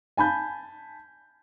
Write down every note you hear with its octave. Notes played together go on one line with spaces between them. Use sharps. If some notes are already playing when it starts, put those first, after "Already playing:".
G#5 A5 B5 G6